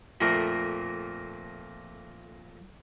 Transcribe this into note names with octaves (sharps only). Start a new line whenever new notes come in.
F2 A#2 A3 A#3